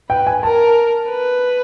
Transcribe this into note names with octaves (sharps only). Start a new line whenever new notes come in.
B4 G5
G#5
A#4 A5
B4